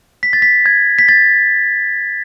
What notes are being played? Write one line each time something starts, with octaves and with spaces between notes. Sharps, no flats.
B6
A6
B6
G#6
B6
A6